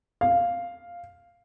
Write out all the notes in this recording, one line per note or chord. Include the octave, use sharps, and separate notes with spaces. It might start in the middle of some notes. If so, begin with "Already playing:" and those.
F5